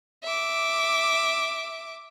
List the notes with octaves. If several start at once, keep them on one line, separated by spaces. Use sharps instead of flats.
E5 D6